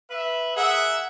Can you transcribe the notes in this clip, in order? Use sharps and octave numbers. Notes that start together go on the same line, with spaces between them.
B4 E5
G#4 A#4 E5 F#5